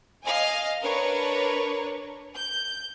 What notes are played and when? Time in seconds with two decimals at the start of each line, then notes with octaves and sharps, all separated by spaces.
0.24 D#5 F5 G#5
0.81 D4 A#4 B4 C#5
2.35 G6